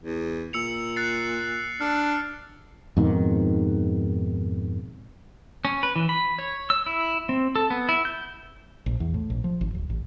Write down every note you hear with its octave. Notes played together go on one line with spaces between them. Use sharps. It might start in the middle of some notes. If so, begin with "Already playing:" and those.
E2
A#2 E6 C#7 F7
F#6 A6 C7
D4 F6
F2 G#2 B2 D#3
C#4
B4
E3
B5
C#5
E6
E4
C4
A4
B3
E4
G6
A#1
E2
A2
A#1
F3
G#1
D1
A1